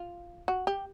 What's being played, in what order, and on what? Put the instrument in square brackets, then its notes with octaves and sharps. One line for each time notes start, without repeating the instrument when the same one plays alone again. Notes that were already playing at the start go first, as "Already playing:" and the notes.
Already playing: [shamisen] F4
F#4
G4